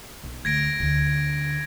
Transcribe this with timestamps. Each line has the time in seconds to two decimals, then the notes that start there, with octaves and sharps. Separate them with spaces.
0.23 B1
0.45 D2 G#6 A#6 D7
0.79 D2 D3